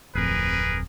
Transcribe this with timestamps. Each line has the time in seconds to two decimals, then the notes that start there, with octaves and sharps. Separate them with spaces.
0.15 D1 F2 G#4 A#4 B4